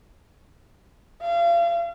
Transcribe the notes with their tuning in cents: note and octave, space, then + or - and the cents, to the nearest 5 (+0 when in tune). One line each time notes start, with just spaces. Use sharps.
F5 -35